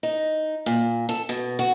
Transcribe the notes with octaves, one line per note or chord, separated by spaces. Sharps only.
D#4
A#2
A4
B2
F#4